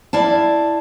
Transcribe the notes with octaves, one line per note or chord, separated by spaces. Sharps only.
E4 D5 F5 A5